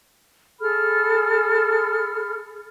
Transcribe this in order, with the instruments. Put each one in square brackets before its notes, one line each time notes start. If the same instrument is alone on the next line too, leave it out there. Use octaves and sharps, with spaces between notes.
[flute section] G#4 A4 B5 F6